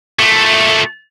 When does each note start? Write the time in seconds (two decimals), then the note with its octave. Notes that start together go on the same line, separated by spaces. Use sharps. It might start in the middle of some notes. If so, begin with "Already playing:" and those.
0.19 A#2 A3